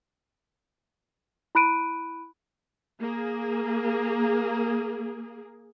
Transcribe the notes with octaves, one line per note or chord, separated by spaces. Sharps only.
E4 B5 F#6 D7 D#7
A#3 G#4